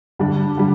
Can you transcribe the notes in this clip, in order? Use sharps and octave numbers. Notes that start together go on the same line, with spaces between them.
D3 G3 D4
D3 G3